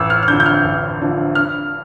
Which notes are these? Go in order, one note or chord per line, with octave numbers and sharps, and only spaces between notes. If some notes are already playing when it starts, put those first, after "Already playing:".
Already playing: A1 E6
F6
F6
G2 D3 F3 G6
G6
F6
A1
G2 D3 F3
G2 F6